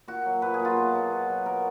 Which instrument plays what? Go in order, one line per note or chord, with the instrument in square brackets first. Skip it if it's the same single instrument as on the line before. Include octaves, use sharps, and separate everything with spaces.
[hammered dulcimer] A#2 F#4
F#3
A#2 B4
G#4
F#3
F4
B2
F#3
B2
F#3
B2 A#4